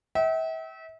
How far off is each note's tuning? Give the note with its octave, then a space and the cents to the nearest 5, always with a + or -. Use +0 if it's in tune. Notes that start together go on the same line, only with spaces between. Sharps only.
E5 -35 G5 -40